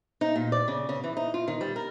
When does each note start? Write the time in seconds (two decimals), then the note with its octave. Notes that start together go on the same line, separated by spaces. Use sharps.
0.21 D#4
0.36 A#2
0.52 D5
0.68 C#3
0.89 C#3
1.04 E3
1.17 D#4
1.34 F4
1.48 D#3
1.61 G3
1.76 A#4